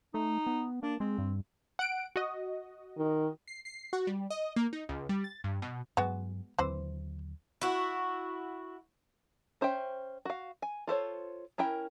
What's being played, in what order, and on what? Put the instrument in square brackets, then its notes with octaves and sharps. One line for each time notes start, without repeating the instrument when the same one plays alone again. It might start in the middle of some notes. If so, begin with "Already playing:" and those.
[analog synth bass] A3 [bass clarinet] D#4
[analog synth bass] B3
[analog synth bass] A#3 [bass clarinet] D4
[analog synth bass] G#3 [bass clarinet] C4
[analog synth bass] G2
[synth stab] F#5 D7
F#4 D#5
[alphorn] D#3
[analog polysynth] C7
C7
F#4
G3
D#5
A#3
D#4
C#2
G3
A6
G2
B2
[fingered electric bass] G2 F#3 [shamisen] G#3 B3 F#4
[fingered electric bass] D#2 D3 F#3 [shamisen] E3 C4 C5
[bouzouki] E4 F#4
[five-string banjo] C#4 C5 E5 G5
F#4 F5
G#5
F4 A4 C5 C#5
C#4 E4 A#4 G5